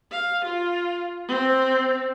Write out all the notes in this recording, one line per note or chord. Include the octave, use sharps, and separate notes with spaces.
F5
F4
C4